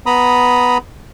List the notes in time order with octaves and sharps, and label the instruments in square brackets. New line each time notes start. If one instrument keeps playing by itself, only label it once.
[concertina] B3 A#5 B5 D#6